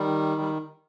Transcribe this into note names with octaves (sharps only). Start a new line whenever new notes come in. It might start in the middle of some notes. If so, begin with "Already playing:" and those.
Already playing: D#3 G3
G3